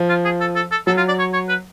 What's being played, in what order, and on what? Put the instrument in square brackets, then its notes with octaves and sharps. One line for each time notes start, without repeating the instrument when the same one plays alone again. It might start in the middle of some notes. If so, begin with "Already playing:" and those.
Already playing: [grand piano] F3
[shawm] F4
G#4
A4
A4
A4
[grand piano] F#3 [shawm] A4
[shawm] F4
D5
C#5
C#5
B4